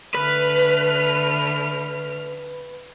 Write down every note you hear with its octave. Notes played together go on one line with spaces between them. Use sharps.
D3 A3 B4 F6